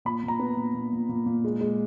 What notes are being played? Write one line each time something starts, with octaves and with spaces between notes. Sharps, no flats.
A#2 B5
A#2 A#5
B3
A#2
A#2
A#2
A#2
A#2
G#3
G#3